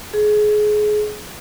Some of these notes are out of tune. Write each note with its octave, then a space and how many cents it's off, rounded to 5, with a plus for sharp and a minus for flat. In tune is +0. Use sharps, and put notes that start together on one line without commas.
G#4 +25